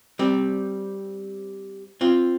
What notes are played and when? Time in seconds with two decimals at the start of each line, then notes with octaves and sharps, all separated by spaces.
0.19 G3 C4
2.01 C4 F4